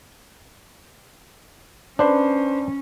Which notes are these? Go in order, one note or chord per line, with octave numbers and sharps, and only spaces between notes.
C#4 D4 B4 C5 B5